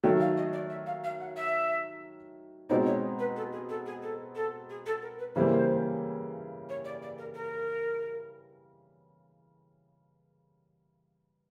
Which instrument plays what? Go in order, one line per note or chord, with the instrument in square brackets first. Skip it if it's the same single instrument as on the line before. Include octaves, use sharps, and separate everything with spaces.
[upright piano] D#3 F#3 A3 [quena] G5
[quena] F5
D#5
D5
E5
F5
F5
F#5
E5
[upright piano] B2 G#3 C4 D#4 [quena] D5
[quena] C#5
B4
A4
G#4
A4
G#4
A4
A4
G#4
A4
A#4
B4
[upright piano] C#3 E3 G3 A#3 [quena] C5
[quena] C#5
D5
D5
A#4
A#4